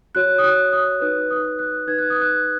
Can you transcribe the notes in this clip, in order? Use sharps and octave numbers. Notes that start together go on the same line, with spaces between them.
F#4 C#5 F#6
D#6
F#6
D#6
D#4 B4 F#6
D#6
F#6
D#4 B4 G#6
F#6
D#6
F#6